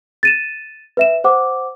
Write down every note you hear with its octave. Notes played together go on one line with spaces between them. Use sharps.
A6 D#7 E7
B4 E5 E7
C5 F#5 D6